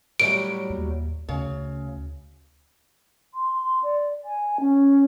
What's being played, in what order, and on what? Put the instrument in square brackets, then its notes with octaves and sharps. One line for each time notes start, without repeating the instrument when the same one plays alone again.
[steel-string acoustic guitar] A2 F#3 G3 [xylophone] D7
[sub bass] D#2
[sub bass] D2 [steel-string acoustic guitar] C#3
[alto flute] C6
C6
D5
G#5
C#4